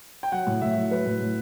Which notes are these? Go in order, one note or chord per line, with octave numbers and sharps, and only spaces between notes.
G5
F#3 F#5
A2
A2 E5
F#3
F#3 B4
A2
A2